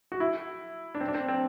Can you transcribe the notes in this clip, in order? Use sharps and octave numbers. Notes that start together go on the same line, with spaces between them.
F#4
E4
D4
C4
D4
C4
C4